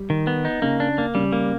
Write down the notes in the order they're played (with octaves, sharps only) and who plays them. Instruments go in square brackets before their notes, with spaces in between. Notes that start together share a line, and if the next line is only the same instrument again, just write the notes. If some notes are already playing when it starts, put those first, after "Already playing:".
Already playing: [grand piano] G3
[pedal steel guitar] D#3
B3
D#4
[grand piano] C#3 [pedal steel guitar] A#3
[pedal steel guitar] D4
A#3
[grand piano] C#3 [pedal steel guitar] G3
[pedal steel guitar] A#3